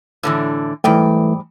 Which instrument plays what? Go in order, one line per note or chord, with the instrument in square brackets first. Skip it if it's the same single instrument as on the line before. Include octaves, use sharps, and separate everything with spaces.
[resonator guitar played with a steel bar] A2 D3 E3
[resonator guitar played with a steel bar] G#2 G3 G5 [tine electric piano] E3 A3